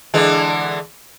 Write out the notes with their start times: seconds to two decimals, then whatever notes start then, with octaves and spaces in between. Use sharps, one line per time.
0.14 D3 E3 G#3